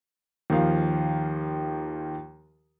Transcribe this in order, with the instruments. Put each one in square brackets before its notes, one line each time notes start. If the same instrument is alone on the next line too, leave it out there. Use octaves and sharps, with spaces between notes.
[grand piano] D#2 D#3 F3 F5